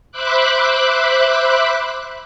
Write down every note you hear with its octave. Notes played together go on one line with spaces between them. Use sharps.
C5 E5 B5 D6 F#6